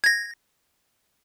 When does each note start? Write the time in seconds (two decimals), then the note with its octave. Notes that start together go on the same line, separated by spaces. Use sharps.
0.04 G#6 A#6